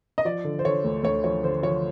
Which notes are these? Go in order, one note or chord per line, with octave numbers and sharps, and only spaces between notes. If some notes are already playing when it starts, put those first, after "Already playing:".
D#5
F3 D5
D3
C5
D3 C#5
D2
D2 C#5
F3 C#5
D3 C5
F3 C#5